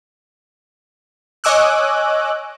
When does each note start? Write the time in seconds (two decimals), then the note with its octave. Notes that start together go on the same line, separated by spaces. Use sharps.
1.44 C#5 D#5 G#5 D6 E6 F#6